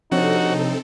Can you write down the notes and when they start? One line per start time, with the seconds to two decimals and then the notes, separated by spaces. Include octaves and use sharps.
0.12 C3 F3 C4 D4 D#4 F#4 A4 C#5